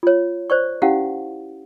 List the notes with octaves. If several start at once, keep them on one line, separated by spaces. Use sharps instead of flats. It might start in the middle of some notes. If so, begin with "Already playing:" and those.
F4 C#5
C5 D5 C#6
C#4 E4 G4 F5 F#5